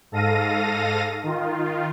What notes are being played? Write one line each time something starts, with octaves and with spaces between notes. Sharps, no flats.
G#2 A4 F5 A#6 D#7
D#3 F4